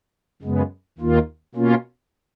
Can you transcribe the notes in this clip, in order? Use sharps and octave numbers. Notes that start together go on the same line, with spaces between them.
F#2 C#3 G#3 B3
D#2 D#3 A#3 F4
B2 A#3 C#4 F4